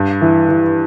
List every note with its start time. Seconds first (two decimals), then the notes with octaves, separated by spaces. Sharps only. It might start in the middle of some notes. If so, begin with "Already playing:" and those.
Already playing: G2
0.21 E3
0.49 E3